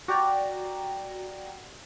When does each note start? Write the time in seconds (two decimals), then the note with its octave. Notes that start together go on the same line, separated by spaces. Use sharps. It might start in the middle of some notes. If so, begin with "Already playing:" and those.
0.08 F#4 G4 D5 G5 A#5